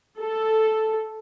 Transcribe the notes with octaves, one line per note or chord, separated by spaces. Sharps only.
A4